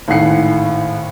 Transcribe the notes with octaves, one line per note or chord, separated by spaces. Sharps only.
G#1 A2 F#5 G#5 C7 C#7